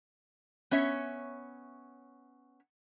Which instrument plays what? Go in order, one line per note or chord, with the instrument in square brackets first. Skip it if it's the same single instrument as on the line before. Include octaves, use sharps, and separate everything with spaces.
[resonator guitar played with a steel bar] B3 C#4 C#5 E5